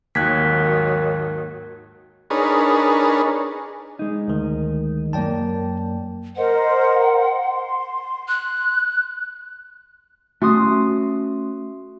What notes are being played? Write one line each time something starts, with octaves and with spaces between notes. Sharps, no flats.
D#2 G#2 D#3 F#3 F#6 G#6 B6
D4 D#4 G#4 A#4 B4 C#5
G#3 D#4
D2 D#3
F#2 A#3 D5 G5 A5
A#4 C5 D#5 F#5
C6
F#6
A3 A#3 C#4 F#4 C6 D#6